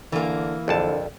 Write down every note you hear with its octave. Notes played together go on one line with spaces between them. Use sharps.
D3 E3 A#3
A#1 F2 D3 A4 D5 A5